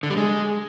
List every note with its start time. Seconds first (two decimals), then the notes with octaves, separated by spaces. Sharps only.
0.03 D3
0.10 G3
0.17 G#3